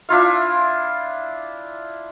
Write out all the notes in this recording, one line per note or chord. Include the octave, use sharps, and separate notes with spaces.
D4 E4 F4 F5